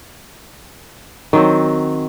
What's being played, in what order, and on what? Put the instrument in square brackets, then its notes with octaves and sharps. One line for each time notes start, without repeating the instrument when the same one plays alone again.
[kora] D#3 F#3 C4